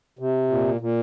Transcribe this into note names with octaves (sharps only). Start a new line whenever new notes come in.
C3
A#2
A#2